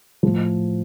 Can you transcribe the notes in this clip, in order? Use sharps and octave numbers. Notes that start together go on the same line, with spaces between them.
A2 F3